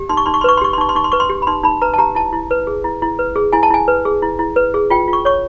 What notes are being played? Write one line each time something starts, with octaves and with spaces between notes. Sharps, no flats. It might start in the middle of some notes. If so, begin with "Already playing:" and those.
Already playing: G4
D#4 C6
C#6
D#4 C6
C#6
C6
B4 C#6
C6
G4 C#6
C6
D#4 C#6
C6
D#4 C#6
C6
B4 C#6
C6
G4
B5
D#4 C6
D#4 B5
B4 A#5
A5
G4 A#5
E4 A5
E4
B4
G#4
E4
E4
B4
G#4
E4 G#5
A5
E4 G#5
B4
G#4
E4
E4
B4
G#4
F4 G5
F4
C#6
C#5 C#6